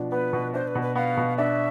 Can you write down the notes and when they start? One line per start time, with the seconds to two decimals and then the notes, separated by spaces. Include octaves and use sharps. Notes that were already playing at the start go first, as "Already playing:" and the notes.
Already playing: B2 F3 D4
0.11 B3 B4
0.33 B2
0.54 D4 C5
0.68 B4
0.75 B2
0.82 B4
0.95 B3 F5
1.17 B2
1.38 D4 E5